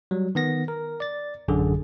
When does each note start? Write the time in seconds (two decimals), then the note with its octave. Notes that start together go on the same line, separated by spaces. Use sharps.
0.11 F#3 G3
0.35 D#3 B3 A#6
0.68 A#4
1.00 D5 A6
1.48 A1 F#2 D3 G#4